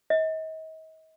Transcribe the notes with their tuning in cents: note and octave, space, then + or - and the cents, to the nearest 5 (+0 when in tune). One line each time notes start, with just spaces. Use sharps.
D#5 +40